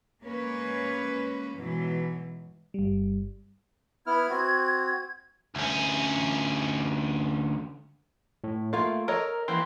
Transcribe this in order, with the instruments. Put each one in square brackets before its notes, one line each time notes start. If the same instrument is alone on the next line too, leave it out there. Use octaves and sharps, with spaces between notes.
[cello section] G#3 A#3 C#4 B4 C#5
G#2 B2 E3 F#3
[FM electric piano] G1 G3
[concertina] B3 E4 F6 [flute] G#6
[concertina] C4 F#4
[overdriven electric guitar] D2 C#4
[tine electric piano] A2
[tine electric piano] A3 [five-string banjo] A#3 F4 F5
[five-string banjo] A4 C#5 D#5 [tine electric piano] A#4
[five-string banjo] E3 A#3 G4 [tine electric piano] G5 C6